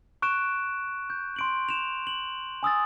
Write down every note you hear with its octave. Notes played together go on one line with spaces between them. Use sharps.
C#6 F#6 D7 E7
G6
C6 D7 F#7
E7 F7
F#7
G#5 D#6 E6 A6